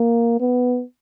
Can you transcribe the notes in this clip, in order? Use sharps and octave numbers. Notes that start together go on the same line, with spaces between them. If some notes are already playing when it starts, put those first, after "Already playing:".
Already playing: A#3
B3